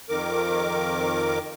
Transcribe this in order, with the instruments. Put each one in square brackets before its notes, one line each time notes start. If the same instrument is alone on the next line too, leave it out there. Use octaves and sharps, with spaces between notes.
[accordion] F2 D#3 A#4 D6